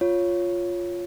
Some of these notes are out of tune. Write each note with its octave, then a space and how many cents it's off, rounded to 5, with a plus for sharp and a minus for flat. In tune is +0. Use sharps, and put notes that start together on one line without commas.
F4 +0 C#5 +0